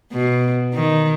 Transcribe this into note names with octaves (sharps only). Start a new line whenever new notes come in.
B2
D#3